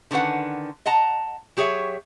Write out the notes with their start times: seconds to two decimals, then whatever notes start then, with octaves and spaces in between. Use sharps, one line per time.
0.11 D3 D#3 C#4 B4 F#5
0.86 D#5 F#5 A5 A#5
1.57 F#3 G4 G#4 C#5 E5